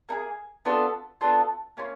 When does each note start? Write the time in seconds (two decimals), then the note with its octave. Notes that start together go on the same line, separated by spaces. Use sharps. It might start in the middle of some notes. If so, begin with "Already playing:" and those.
0.09 A#3 D#4 G#4
0.65 B3 D4 F4 A4
1.21 B3 D4 F4 A4
1.77 A#3 C#4 F4